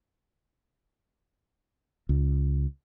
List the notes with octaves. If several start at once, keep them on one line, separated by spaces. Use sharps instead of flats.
C#2